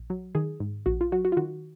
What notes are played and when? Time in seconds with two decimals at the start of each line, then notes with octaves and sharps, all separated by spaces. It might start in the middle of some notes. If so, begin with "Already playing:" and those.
Already playing: A#1
0.10 F#3
0.35 D#3 G#4
0.60 G#2
0.86 A#1 F#4
1.01 F4
1.12 F#3 F#4
1.25 F#4
1.32 F4
1.37 D#3 F#4